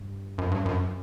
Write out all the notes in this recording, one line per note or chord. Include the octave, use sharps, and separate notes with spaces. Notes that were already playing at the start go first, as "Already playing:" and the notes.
Already playing: G2
F#2
G2
F#2